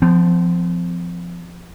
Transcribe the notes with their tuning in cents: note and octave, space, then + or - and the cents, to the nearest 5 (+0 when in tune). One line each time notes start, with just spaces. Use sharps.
F3 -5 C4 -45